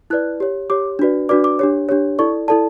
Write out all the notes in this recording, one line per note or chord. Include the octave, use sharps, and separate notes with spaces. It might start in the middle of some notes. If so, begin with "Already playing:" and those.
E4 B4 D5 F#6
G4 C#5
G4 C#5 D6
D4 F#4 B4 D5
D4 F#4 B4 D5 D6
D6
D4 G4 C#5
D4 G4 C#5
E4 A4 D5 C#6
E4 A4 D5 A5